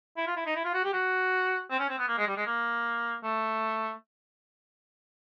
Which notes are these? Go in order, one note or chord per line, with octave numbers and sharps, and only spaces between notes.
E4
F4
E4
D#4
E4
F4
F#4
G4
F#4
C4
C#4
C4
B3
A#3
G#3
G3
G#3
A#3
A3